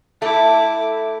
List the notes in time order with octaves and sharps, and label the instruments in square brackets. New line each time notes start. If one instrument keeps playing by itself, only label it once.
[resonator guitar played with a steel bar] A3 [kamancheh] E4 D6